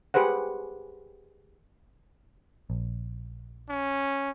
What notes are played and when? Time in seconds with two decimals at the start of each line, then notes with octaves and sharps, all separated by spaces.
0.14 G4 G#4 B4 C5 F#5
2.70 A#1
3.69 C#4